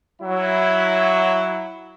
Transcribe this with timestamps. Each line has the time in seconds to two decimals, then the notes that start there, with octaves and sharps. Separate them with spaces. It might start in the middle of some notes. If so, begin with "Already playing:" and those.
0.21 F#3 E4